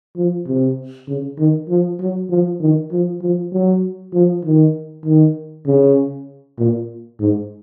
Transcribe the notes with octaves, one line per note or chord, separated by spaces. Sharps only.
F3
C3
C#3
D#3
F3
F#3
F3
D#3
F3
F3
F#3
F3
D#3
D#3
C#3
A#2
G#2